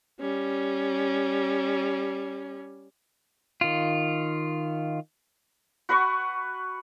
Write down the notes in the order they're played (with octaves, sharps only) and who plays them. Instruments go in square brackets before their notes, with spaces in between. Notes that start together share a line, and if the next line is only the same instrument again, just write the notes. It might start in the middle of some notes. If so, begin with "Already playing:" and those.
[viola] G3 C#4
[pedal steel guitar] D#3 F4
[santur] F#4 B4 F#5 C#6